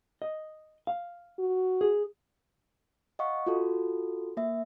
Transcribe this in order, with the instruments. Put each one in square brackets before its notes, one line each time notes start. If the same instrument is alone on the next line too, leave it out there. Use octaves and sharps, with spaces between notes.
[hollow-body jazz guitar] D#5
F5
[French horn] F#4
[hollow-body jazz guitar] G#4
[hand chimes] D#5 F5 F#5 C#6
F4 F#4 A4
A#3 E5